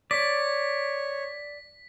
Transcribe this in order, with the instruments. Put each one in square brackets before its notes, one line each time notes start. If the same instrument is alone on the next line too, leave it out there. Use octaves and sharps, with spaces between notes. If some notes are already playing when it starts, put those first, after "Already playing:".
[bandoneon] C#5 [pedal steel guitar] D5 [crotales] B6